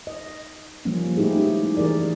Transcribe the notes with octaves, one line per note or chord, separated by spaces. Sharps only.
D#5
F3 G3 A#3 C#4
G#3 A3 D#4 E4 G4 G#4
C#4
E3 G#4 A#4 D5